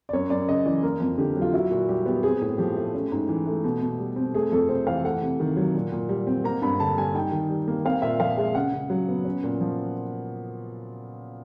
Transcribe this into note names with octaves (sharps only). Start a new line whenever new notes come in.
D5
F#2 C#5
F#2 D5
C#3 D#5
E3 D5
A#3 A#4
F2
D3 G4
F#3
F4
E4 F#4
A#2 F#4
G3 G4
B3 G4
C4 G#4
A2
F3 G4
A3
C#4
G#2
E3
A3
B2
B2
G3
C4
A3 G#4
F2 A4
C3 C5
E3 F5
A3 F#5
C3
D#3
F#3
A#2
A#2
G3
C4
A#3 A#5
G2 B5
D3 A5
G3 G#5
D#4 G5
D#3
G3
A#3
C4 F5
A#2 E5
F3 F5
G#3 E5
C#3 F#5
C#3
F#3
B3
C#4
A#2
F3